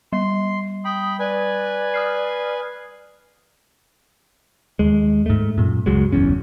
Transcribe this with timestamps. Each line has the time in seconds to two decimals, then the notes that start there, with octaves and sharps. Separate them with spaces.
0.13 G3 C6
0.85 G5 B5 D#6
1.19 B4 D5 G#5
1.94 D#6 F6 C7
4.79 D#2 G#3
5.26 G#2 A3
5.58 F#2 A#2
5.86 C#2 F#2 F#3 G#3
6.12 F#1 B1 E2 C#4